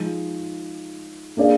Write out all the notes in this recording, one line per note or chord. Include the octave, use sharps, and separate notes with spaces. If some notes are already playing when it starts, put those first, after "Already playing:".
Already playing: F3 G#3 D#4
A#3 D4 G#4 D5 F5